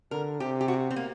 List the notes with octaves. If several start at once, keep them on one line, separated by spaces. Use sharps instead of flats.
D3 A#4
C3 G4
G4
F#4
C4
A#3